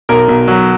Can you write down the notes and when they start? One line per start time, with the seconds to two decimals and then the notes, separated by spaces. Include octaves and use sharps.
0.09 B1 A#4
0.29 B1
0.48 F#3